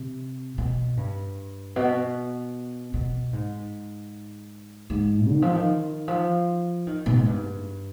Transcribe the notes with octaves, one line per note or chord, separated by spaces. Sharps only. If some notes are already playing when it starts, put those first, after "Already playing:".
Already playing: C3
B2
G2
B2
B2
G#2
G#2
D#3
F3
D#3
F3
D#3
B2
G#2
G2